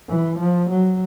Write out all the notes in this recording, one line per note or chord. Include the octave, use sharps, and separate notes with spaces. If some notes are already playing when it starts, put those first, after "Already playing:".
E3
F3
F#3